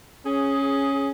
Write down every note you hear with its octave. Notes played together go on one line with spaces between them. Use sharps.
C#4 G#4